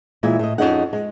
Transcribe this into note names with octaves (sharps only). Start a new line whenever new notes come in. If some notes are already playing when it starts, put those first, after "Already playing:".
A#2 E3 G#3 E4 E5
A2 D#5
F2 G3 C#4 D#4 G#4 F#5
G#3